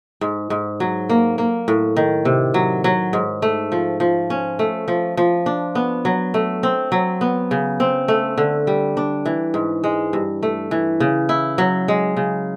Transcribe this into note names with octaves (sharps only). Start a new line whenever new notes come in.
G#2
G#2
F#3
A#3
A#3
A2
D#3
C3
F#3
F#3
G#2
A3
F3
F3
C#4
A3
F3
F3
D4
B3
F#3
A3
C4
F#3
B3
C#3
C4
A3
D3
G3
D4
E3
G#2
G#3
G2
A3
E3
C#3
E4
F#3
G#3
C#3